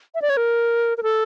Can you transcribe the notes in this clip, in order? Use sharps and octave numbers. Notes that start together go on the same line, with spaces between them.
E5
D5
C#5
A#4
A#4
A4